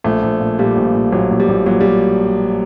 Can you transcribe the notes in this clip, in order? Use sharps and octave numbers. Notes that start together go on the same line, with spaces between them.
A#1 A3
A#1
A#2
A#2 G3
A#1
A#2
A#1 F#3
A#1
G3
A#1
A#2 F#3
G3